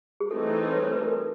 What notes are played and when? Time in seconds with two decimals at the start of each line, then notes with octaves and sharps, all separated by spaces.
0.20 G#4
0.31 E3 A3 C4 D#4 A4
0.72 B4 C#5
0.83 C5
0.92 B4
1.02 A#4
1.13 A4